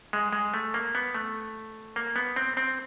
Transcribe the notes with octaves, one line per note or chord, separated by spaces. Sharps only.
G#3
G#3
A3
A#3
B3
A3
A#3
B3
C4
C4